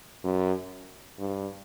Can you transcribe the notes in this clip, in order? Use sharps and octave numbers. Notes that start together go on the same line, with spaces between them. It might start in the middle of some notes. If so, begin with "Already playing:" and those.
F#2
G2